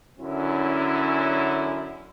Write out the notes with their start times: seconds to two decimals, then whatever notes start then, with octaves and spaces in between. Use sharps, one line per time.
0.20 F#2 D3 C#4 E4